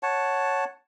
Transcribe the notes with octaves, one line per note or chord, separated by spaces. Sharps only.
C#5 F#5 A5